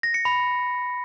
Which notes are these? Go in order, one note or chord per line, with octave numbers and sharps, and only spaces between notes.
A#6
C#7
B5